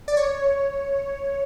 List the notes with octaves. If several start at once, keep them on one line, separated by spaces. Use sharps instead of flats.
D5
C#5